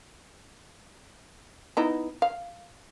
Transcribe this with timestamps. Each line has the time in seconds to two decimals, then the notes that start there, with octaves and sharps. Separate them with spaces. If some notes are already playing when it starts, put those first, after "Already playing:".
1.77 B3 D#4 E4
2.22 F5